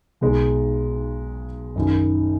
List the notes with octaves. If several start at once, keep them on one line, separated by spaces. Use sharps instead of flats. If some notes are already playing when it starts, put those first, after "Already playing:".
B1 B2 G#3 D#4
F#1 F#2 D#3